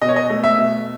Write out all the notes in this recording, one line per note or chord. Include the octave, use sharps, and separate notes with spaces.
B2 D#5
C#5
D#5
A3
E5
B2